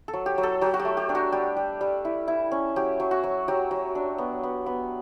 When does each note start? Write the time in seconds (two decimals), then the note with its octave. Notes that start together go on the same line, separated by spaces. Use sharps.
0.08 A4
0.13 F#3
0.26 G4
0.38 F#3
0.43 A4
0.61 F#3 G4
0.74 F#4
0.79 G4
0.85 A3
0.97 G4
1.09 D4
1.15 F#4
1.32 G3 G4
1.57 G3
1.81 G3
2.05 E4
2.28 E4
2.51 C#4
2.76 F#3 G4
3.00 F#3
3.11 F#4
3.24 F#3
3.48 F#3 G4
3.71 F#3
3.95 D4
4.18 B3
4.43 B3
4.66 B3